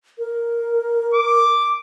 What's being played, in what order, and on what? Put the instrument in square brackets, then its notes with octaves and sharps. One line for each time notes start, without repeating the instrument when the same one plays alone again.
[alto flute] A#4
[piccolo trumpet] D6